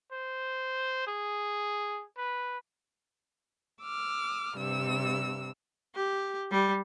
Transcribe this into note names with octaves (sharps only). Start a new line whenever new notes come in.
C5
G#4
B4
D6 E6 F6
G2 C3 E6
G4
G3